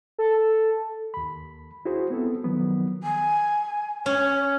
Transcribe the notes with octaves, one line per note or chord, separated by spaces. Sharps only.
A4
D#2 B5
E4 F#4 G#4 C5
B3 C4 E4 A4
D#3 F3 F#3 B3
G#5
C#4 C#5